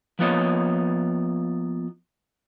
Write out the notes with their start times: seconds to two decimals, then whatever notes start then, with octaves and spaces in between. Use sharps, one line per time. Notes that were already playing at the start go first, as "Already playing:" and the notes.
0.19 F3 A#3 B3 F4 C#5 D#5